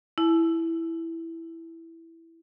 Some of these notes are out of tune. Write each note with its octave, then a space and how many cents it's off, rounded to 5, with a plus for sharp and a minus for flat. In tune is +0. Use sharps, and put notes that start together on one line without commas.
E4 +0 A5 -45